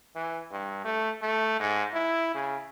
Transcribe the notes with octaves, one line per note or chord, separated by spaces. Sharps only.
E3
G2
A3
A3
G#2
E4
C#3